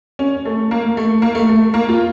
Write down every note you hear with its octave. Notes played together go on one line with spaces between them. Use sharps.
C#4
A3
A#3
A3
A#3
A3
A3
A#3
F4